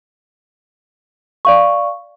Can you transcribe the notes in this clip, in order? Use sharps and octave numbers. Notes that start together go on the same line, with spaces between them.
D5 F5 C#6